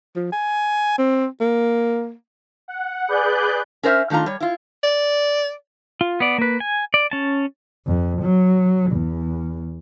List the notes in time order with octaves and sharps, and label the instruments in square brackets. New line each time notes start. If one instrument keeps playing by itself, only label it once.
[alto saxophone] F3
G#5
C4
A#3
[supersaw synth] F#5
G#4 B4 D5 F#6 G6
[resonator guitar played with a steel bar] C#4 A#4 C5 D#5 E5
D#3 A3 D4 F4 A#5
G3 C#5
E4 F4
[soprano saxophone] D5
[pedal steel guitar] F4
B3 D5
A#3 B4
G#5
D5
C#4 A5
[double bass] F2
F#3
E2